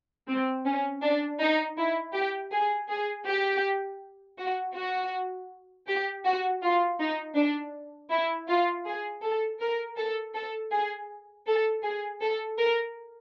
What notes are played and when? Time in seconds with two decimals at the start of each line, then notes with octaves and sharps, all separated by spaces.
0.28 C4
0.65 C#4
1.02 D4
1.41 D#4
1.78 E4
2.14 G4
2.52 G#4
2.89 G#4
3.27 G4
4.38 F#4
4.76 F#4
5.88 G4
6.25 F#4
6.63 F4
6.99 D#4
7.36 D4
8.10 E4
8.49 F4
8.86 G#4
9.23 A4
9.60 A#4
9.97 A4
10.35 A4
10.71 G#4
11.47 A4
11.84 G#4
12.22 A4
12.59 A#4